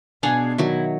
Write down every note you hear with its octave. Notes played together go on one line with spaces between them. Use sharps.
B2 D4 G#4 F5 F#5
D#3 F#3 E4